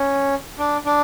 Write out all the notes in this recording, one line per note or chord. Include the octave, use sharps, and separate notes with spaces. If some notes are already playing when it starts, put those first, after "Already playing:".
Already playing: C#4
D4
D4